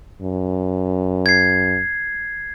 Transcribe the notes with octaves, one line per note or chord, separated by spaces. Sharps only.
F#2
G#6 C7